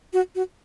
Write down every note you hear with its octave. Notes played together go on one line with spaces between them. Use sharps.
F#4
F#4